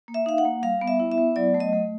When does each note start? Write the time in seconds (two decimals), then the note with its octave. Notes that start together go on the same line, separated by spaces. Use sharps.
0.08 A#3
0.14 E5
0.26 D#4 F5
0.38 F#5
0.45 A#3
0.63 G3 F5
0.81 B3
0.88 E5
1.00 E4
1.12 E5
1.18 B3
1.36 F#3 D5
1.54 A3
1.60 D#5
1.73 A3